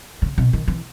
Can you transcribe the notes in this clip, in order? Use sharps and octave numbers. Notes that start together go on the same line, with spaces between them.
C#3
B2
D#3
E3